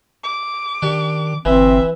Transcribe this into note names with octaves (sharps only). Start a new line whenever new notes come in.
D6
D#3 D4 G4
G1 E3 C4 E5